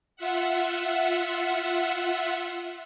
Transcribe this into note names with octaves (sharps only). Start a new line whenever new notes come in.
F4 E5 F#5